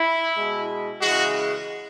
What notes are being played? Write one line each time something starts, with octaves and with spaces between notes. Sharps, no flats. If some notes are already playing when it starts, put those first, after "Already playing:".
Already playing: E4
B2 G#3
C#3 E3 G#3 F#4